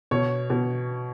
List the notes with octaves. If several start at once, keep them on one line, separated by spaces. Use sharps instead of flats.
B2 C#5
B2